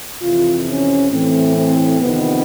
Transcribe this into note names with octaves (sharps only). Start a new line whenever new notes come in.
F2 C3 E3 F4
C#4
A2 E3 C4
C4
F2 C3 D#3 B3